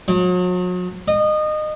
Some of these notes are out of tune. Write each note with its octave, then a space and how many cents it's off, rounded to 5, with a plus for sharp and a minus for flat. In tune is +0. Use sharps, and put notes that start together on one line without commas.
F#3 -40
D#5 -25